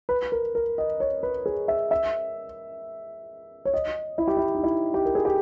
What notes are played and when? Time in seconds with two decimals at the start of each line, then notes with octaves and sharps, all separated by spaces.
0.09 B4
0.32 A#4
0.55 A#4
0.78 D#5
1.00 C#5
1.23 B4
1.46 G#4
1.68 E5
1.91 E5
3.65 C#5
3.74 D#5
4.18 E4
4.28 G4
4.37 E4
4.55 D#4
4.64 E4
4.94 G4
5.05 A#4
5.15 G#4
5.25 G4